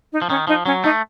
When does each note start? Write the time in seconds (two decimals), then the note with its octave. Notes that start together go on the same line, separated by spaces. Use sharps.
0.12 D#4
0.22 F3
0.29 D#3 C#4
0.47 F3 D#4
0.66 F#3 C#4
0.84 A3 D#4